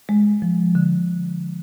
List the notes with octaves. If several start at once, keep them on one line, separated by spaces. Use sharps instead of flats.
G#3
F3
D3